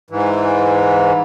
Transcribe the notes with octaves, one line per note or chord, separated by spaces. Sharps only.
G#2 E3